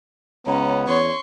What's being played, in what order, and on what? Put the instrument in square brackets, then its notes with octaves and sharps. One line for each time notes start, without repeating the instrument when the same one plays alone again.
[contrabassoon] C#2 [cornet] B3 [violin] C#4 [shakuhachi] A#5
[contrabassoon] E2 [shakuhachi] C#5 [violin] C6 C#6